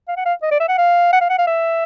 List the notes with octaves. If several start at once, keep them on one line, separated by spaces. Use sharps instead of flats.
F5
F#5
F5
D#5
D5
E5
F#5
F5
F#5
F5
F#5
F5
E5